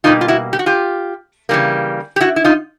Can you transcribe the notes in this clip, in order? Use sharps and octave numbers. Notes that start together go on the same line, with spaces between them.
B2 G3 A#3 D#4 F4
F4
E4 F#4
G4
F#4
F4 G4
C#3 E3 G3 A#3
G4
E4 F#4
E4
D#4 F4